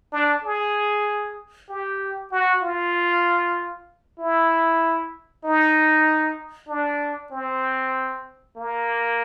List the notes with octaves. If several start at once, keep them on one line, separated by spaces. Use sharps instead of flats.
D4
G#4
G4
F#4
F4
E4
D#4
D4
C4
A#3